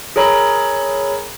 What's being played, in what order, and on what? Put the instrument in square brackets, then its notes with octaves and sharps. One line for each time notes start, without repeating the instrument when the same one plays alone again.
[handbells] G#4 A#4 C#5 A#5 B5 E6